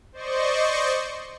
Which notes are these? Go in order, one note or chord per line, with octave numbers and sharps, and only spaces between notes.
C5 D5 D#5 C#6